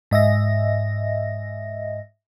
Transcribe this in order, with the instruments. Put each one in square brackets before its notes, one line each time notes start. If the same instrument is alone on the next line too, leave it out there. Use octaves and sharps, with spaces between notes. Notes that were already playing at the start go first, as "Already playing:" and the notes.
[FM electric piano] G#2 D#5 E5 A#6